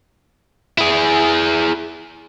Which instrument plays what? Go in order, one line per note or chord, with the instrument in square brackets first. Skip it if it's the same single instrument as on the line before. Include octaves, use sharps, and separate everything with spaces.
[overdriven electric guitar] E4 G#4